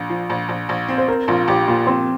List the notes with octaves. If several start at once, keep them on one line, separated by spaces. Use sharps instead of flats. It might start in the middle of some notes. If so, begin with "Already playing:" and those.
Already playing: A#1
F3
A#1
A#1
A#1
C4
C5
C4 A#4
A#1 F4
A#1 G4
A#2 F4
F3 C4